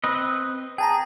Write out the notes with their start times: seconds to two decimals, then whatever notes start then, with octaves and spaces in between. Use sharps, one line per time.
0.04 C4 B4 D#5
0.78 G#4 G5 A5 A#5